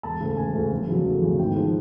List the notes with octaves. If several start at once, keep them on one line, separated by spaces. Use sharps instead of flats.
E1 A5
D2 C#3
E1 G#5
D2 C#3
F1
E2 C#3 F#3 A3
F1
E2 C#3 F#3 A3
G#1 G5
G#2 F3